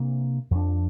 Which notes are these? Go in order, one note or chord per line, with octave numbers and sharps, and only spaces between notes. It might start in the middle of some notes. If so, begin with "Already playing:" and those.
Already playing: C3 A#3 D4
F2 F3 D4